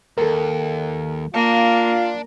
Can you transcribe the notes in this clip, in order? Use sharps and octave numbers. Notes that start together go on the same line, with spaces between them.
D#2 A4 A#4
A#3 F4 D5 F5 A5